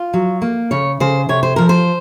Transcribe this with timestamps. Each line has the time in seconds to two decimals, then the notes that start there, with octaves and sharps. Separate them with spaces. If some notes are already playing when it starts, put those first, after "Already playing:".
Already playing: F4
0.14 F#3
0.42 A#3
0.71 C#3 C#5
1.00 C#3 C5
1.29 C3 C#5
1.43 C5
1.56 F3 A#4
1.69 C5